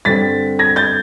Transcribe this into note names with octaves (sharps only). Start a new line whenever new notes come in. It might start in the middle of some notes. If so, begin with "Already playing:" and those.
G2 D3 G3 C4 A6 B6
G#6 A#6
G6 A6